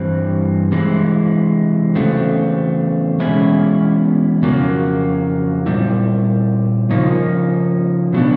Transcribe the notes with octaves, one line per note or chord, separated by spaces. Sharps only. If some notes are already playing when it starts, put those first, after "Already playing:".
Already playing: G2 E3 G3 C4
C3 E3 G#3
E2 C#3 F#3 A3 C4
E2 B2 G#3 C#4 E4
F2 C#3 F#3 A#3
A#2 G3 C4 E4
C#3 F3 A#3 D#4
B2 F#3 B3 D4